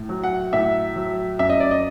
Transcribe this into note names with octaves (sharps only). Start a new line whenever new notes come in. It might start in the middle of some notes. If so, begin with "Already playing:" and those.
Already playing: A2
F#3
F#5
A2 E5
F#3
F#2 E5
D#5
D5
D#5